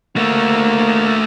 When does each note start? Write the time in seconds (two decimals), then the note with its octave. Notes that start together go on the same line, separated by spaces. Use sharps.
0.16 A3 A#3 F#4